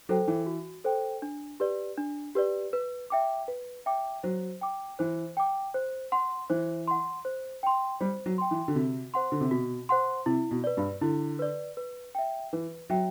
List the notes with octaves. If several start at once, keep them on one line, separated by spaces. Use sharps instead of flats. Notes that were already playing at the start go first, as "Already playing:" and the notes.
F#3 A4 C5 G5
E3
F#4
A4 C5 G5
D4
G4 B4 D5
D4
G4 B4 D5
B4
E5 G5 D6
B4
E5 G5 D6
F#3 C5
G5 D6
E3 C5
G5 D6
C5
F#5 C6
E3 C5
F#5 C6
C5
G5 C6
G3 C5
F#3
G5 C6
E3
D3
C3 F#4
C5 F#5 C6
D3
C3
B2 F#4
C5 F#5 C6
C3 E4
B2
B4 D5
G2
D3 E4
B4 D5
B4
E5 G5
E3 B4
F#3 E5 G5